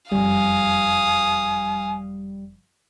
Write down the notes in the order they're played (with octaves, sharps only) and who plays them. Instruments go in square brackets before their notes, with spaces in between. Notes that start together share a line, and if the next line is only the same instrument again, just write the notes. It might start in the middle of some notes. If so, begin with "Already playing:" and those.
[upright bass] F#1 F2 [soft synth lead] G3 [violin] F5 D#6 [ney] G#5